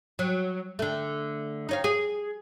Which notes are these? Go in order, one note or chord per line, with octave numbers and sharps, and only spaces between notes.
F#3
D3 A3
D#4 C#5 F5
G#4